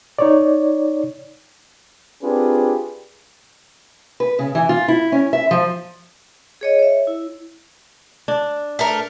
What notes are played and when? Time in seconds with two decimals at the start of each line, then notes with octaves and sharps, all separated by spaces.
0.19 D#4 C#5 D5
2.23 C4 D4 F4 G4 G#4 B4
4.20 B4
4.39 C#3
4.55 E3
4.69 F4
4.88 E4
5.12 C#4
5.33 E5
5.51 F3
6.61 G#4 C#5 D#5
6.79 C#5 E5
7.07 E4
8.28 D4
8.79 A3 A#4